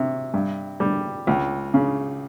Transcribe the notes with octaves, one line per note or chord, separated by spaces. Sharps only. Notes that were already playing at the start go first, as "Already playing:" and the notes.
Already playing: C3
G2
G3
C#2
C#3